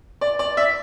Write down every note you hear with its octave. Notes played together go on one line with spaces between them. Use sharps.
D5
D5
E5